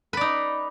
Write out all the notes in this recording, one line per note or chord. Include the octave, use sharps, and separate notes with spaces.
D#4 B4 D5